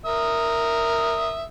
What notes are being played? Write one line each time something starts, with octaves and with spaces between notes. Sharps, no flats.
A#4 E5 D#6